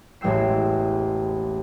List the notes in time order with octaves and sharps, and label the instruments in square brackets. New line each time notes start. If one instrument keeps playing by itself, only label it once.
[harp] E1 A1 G#3 G5 E6 C7